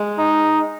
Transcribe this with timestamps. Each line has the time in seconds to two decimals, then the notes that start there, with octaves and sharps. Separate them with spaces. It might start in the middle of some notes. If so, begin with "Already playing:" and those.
Already playing: G#3
0.18 D#4